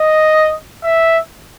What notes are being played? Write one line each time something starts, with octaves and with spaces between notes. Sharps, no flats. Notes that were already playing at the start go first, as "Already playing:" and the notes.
Already playing: D#5
E5